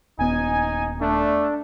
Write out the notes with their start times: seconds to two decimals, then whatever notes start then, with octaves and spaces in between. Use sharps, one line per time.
0.19 D#1 B3 D#4 G#5
1.01 A3 D4